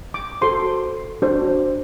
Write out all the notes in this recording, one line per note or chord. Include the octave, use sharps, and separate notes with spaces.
D6
F#4 A4 C5 C6
D4 F#4 C5